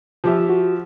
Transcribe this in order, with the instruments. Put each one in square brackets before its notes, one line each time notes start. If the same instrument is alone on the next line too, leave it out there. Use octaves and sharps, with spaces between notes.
[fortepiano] F3 G4 E5
[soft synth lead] F#4